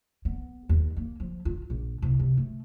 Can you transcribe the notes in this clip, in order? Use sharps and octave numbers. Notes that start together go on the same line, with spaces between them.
B3
D#2
A#3
F3
F4
A#1
C2
C3
A3